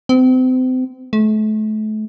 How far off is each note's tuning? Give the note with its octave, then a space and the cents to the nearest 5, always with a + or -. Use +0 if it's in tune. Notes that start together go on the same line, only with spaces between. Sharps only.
C4 -35
A3 -35